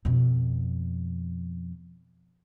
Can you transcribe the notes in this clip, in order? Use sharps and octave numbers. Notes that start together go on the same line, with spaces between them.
F2 B2